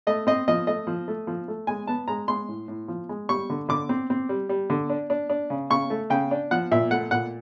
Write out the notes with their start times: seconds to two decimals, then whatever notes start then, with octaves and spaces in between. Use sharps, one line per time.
0.07 A3 D#5
0.27 C4 D#5
0.48 F3 D#5
0.67 A3 D#5
0.87 F3
1.08 A3
1.27 F3
1.48 A3
1.67 G#3 G#5
1.87 B3 A5
2.08 G#3 A#5
2.28 G#3 C6
2.48 A2
2.68 A2
2.88 F3
3.09 G#3
3.29 G3 C#6
3.50 D3
3.69 D3 D6
3.89 C4
4.10 C4
4.29 G3
4.49 G3
4.70 D3
4.90 D4
5.10 D4
5.30 D4
5.50 C#3
5.70 C#3 C#6
5.90 A3
6.10 C#3 G5
6.31 D4
6.51 F3 F#5
6.71 A#2 E5
6.91 A3 F#5
7.11 A#2 F#5